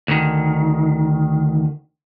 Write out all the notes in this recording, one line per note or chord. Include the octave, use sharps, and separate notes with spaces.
D2 D#3